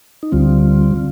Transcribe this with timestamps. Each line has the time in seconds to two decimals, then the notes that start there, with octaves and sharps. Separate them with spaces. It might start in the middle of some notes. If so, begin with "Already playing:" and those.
0.23 D#4
0.32 D2 D3 G3 C4 F4
0.96 D3